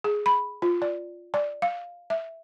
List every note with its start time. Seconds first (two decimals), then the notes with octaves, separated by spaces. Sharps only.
0.04 G#4
0.26 B5
0.62 F4
0.82 D5
1.34 D5
1.62 F5
2.10 E5